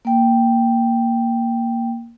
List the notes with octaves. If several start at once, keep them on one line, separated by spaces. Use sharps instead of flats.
A#3 G5